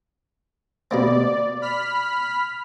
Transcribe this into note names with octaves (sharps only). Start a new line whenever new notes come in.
B2 A#3 C4 D5
B5 F6 B6